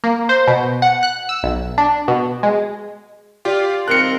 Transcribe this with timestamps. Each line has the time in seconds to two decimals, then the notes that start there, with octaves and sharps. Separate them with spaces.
0.04 A#3
0.29 C5
0.48 B2
0.82 F#5
1.03 F#6
1.29 E6
1.43 B1
1.78 D4
2.08 B2
2.43 G#3
3.45 F4 G4 D5
3.88 D#3 G3 C4 A#4 F#6 C#7